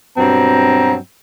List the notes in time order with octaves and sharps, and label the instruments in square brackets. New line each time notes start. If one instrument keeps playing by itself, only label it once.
[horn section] G2 B2 F#3 C4 A#5